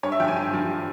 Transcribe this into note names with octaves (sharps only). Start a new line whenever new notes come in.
G2 C#5
E5
F3 G5
G#5
G2
F3